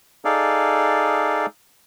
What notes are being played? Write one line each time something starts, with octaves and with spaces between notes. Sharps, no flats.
D#4 G#4 A4 D5 F5